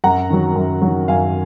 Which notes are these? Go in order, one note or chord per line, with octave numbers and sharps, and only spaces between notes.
F#2 F#5 A#5
D#3 F#3
F#2
F#3
D#3
F#2 F5 G#5